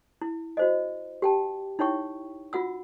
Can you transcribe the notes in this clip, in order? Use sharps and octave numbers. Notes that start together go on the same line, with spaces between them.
E4
F#4 C5 D#5
G4 G5 A5
D#4 E4 C#5 G5 C#6
F4 F#4 F#5 E6